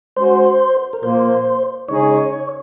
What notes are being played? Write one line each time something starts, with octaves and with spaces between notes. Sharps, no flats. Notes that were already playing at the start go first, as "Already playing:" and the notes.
G#3 C#4 F#4 C5
A#4
A#2 F3 A#3 C5
C#3 G#3 D#4 G#4 C#5